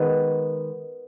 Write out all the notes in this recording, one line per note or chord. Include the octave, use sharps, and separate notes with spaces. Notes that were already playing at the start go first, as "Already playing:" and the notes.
Already playing: D#3 G#3 B3